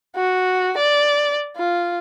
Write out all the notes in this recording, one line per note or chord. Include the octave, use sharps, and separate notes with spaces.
F#4
D5
F4